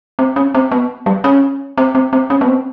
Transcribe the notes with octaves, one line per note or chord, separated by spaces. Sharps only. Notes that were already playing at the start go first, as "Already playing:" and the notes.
C4
C#4
C4
B3
G3
C#4
C4
C4
C4
C#4
B3
C4